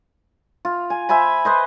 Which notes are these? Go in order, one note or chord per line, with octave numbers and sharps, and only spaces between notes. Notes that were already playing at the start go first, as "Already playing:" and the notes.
F4
G#5
C5 E5 G#5 B5
B4 C5 D#5